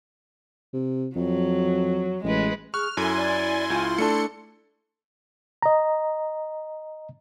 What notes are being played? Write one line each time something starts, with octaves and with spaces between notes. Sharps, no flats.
C3
F2 F#3
A1 G#3 B4
G#4 C#6 F6 F#6
F#2 E4 A4 G#5 C6
D5
C#2 F4
A3 D4 A4 C#7
D#5 A#5